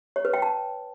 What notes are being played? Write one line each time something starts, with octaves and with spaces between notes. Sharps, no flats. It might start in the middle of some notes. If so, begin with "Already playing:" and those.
C#5
B4
G5
A5